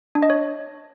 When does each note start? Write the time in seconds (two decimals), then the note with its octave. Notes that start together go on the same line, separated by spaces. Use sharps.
0.15 D4
0.22 D#5
0.30 C#5